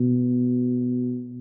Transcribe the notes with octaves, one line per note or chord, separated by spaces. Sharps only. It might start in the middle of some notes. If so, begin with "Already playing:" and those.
Already playing: B2